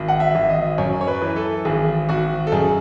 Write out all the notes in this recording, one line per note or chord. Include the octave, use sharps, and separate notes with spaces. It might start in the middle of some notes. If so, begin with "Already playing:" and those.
Already playing: G#1
F#5
E5
G#1
D#5
F#2 C#5
C#5
B4
E3
A4
G#1 G#4
G#1 F#4
A4
F#2 G#4